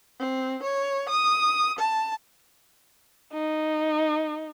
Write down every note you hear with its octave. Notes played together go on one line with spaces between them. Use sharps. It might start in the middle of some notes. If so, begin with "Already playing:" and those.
C4
C#5
D#6
A5
D#4